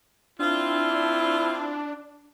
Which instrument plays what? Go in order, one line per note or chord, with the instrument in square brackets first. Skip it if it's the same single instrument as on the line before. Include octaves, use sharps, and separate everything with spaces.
[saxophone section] C4 F4 [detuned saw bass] D4 [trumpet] E4